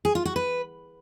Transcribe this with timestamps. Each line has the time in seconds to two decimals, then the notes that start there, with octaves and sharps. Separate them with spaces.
0.05 G#4
0.15 F4
0.25 F#4
0.36 B4